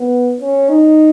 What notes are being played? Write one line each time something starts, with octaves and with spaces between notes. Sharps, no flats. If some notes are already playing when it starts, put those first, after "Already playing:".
Already playing: B3
C#4
D#4